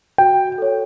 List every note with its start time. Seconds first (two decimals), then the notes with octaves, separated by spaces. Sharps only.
0.18 F#4 G5
0.58 A4 C#5